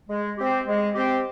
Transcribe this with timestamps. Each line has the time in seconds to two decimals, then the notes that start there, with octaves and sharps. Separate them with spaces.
0.09 G#3
0.38 C4 G4
0.67 G#3
0.95 C4 G4